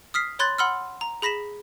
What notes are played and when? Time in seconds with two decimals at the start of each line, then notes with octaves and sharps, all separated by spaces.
0.14 D#6 F6 B6 C7
0.39 C#5 B5 C6 F#6 G#6 A6
0.58 F#5 B5 C6 E6 F6
1.01 A#5
1.22 G#4 B5 A#6 B6 E7